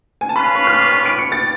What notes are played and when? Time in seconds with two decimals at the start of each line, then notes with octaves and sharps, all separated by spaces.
0.21 G#5
0.29 A5
0.36 C#4 F4 B4 F5 B5
0.55 C#6
0.67 F6
0.73 D6
0.92 B6
1.06 D7
1.19 C#7
1.32 A6